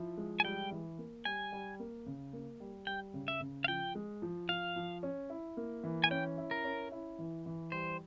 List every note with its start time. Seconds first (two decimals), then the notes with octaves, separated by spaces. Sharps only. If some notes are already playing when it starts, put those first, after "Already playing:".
Already playing: F3 E4
0.17 G#3
0.40 G#5
0.44 G3 G5
0.71 E3
0.99 A#3
1.25 G3 G#5
1.52 G3
1.80 A#3
2.06 C#3
2.33 A#3
2.60 G3
2.87 G3 G5
3.14 C#3
3.28 E5
3.41 C#3
3.64 F5
3.68 F3 G5
3.95 G#3
4.22 F3
4.49 F3 F5
4.76 F3
5.03 C#4
5.30 E4
5.57 A#3
5.84 E3
6.04 G#5
6.11 C#4 G5
6.38 E4
6.51 A#4
6.64 C#4
6.92 E4
7.19 E3
7.46 E3
7.72 G3 C5